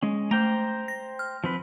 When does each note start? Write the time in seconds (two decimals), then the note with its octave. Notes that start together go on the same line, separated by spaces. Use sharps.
0.03 G#3 C#4
0.31 A3 C5 G5 A#5
0.88 A#6
1.19 F6
1.44 F3 C4 B4